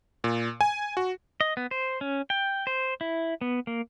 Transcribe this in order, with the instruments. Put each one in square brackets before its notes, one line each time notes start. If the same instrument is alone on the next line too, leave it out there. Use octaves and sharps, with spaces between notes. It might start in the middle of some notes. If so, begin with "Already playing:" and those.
[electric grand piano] A#2
G#5
F#4
[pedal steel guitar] D#5
B3
C5
C#4
G5
C5
E4
B3
A#3